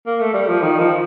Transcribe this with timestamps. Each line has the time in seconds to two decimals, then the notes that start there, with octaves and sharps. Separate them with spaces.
0.07 A#3
0.20 A3
0.34 G3
0.49 F3
0.62 D#3
0.79 F3